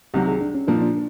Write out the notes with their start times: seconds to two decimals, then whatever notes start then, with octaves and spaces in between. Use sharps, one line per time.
0.14 C2 C3 D#3 F#3 G4
0.27 G#4
0.41 D4
0.55 C#4
0.68 A#2 F3 A#3 D4
0.75 D#4
0.82 D4